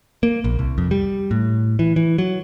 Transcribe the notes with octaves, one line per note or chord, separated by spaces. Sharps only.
A#3
A#1
C2
F2
G3
A2
E3
E3
F#3